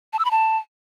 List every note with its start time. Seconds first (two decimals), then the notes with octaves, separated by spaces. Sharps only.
0.13 A5
0.19 E6
0.25 B5
0.31 A5